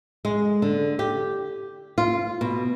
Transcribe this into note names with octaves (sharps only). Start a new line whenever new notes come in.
G#3
D3
G4
F4
B2